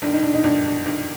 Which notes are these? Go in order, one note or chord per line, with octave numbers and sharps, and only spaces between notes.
G1 G2 D#3 D4
D#4
D4
D#4
G1 G2 D#3 D4
D4
G1 G2 D#3